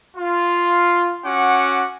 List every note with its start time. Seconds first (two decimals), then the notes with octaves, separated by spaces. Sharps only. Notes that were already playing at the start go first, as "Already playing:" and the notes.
0.17 F4
1.26 C#4 F#4 F#5 D6